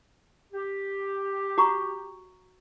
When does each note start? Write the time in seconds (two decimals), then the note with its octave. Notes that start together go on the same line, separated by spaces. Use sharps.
0.52 G4
1.58 F#4 A#5 C#6